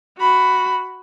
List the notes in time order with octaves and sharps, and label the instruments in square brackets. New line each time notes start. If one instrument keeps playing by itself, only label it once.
[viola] F#4 B5